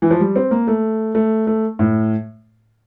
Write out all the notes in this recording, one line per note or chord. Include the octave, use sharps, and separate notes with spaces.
E3
F3
G3
C4
A#3
A3
A3
A3
A2